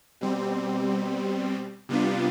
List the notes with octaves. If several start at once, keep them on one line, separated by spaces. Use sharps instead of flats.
B2 G3 C4
C3 G3 B3 D4 F4